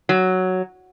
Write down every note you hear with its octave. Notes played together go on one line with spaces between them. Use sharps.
F#3